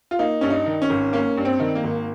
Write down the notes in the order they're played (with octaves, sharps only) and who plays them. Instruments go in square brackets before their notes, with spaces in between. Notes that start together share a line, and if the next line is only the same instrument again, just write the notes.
[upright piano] F4
A#3 D#4
G2 C#4
D#4
D#3
C#4
G#1
A#3 C#4
G2
C4
D#3
A#3
G#1